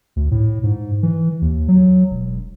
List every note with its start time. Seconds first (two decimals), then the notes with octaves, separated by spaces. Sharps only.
0.16 D2
0.31 A2
0.63 G#2
1.03 E3
1.42 D#2
1.68 F#3
2.11 E1